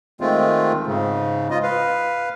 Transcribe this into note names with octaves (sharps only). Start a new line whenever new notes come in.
D#3 G#3 A3 C4 F4
G#2 C#3
F4 D#5
B4 F5